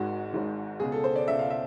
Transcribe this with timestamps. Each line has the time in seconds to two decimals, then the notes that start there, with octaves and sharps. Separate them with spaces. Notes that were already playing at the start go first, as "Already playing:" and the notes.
Already playing: G#1 G#2 D#3 F#4
0.33 G#1 G#2 D#3
0.80 C#2 B2 G#4
0.92 A4
1.04 C5
1.16 D5
1.28 C#2 B2 E5
1.39 F5
1.50 E5